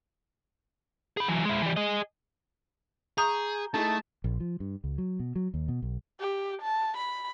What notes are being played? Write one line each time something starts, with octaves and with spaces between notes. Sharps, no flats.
G#4 B5
E3 F#3
G#3 E4
E3 G3
G#4 D#5
G#4 A#5 C#6 D#6 G6
A3 D#4 E4 G#4 A5
A#1
F3
G2
C#2
F#3
B2
F#3
D#2
B2
B1
G4
A5
B5